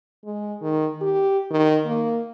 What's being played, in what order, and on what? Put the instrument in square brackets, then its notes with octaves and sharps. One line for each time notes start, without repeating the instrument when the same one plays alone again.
[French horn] G#3
D#3
G4
D#3
A#3